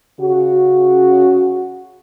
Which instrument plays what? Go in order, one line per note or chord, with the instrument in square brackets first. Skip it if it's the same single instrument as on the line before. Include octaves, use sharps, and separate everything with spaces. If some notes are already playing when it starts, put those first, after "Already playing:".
[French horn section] C#3 F#4